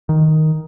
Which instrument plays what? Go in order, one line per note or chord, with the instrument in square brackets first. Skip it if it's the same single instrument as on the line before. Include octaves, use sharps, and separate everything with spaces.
[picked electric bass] D#3